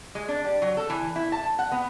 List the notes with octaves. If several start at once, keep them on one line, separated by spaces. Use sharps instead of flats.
G#3
D4
G3
F#3
A4
E3
E4
A5
F#5
B3